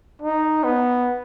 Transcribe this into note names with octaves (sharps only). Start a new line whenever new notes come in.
D#4
B3